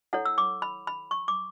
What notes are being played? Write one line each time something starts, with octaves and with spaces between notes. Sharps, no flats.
E4 A4 C#5 F#5
E6
D6
B5
B5
C#6
D6